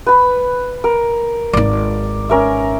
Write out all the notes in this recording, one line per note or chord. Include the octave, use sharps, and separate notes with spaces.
B4 B5
A#4
G#1 D#4 D5
C#4 A#4 E5